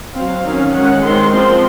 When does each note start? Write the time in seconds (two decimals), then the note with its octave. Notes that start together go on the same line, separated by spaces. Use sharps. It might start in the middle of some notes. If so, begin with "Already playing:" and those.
0.15 F#3 C4 F5
0.45 D#3 F#3 C#4
0.74 D#3 G#3 C#4 F#5
1.03 D#3 G#3 C4 C6
1.32 F3 C4